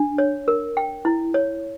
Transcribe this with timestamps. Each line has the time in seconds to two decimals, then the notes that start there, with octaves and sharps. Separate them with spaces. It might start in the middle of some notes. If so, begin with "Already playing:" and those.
Already playing: D4
0.18 C#5
0.48 A#4
0.77 G5
1.05 E4
1.34 C#5